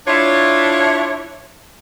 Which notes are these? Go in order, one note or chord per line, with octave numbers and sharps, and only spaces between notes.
D4 E4 F4 C#5